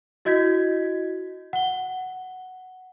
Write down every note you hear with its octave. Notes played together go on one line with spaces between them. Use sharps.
E4 F#4 D#5 G6 G#6 B6
F#5 G7